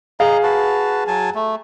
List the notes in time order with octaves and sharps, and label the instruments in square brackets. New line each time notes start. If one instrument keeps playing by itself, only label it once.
[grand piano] G#4 F5 [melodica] D#5 A#5
[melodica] F#4 B4 A5
F#3 G#5 A5
A3